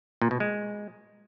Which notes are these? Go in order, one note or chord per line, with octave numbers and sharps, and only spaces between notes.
A#2
B2
G#3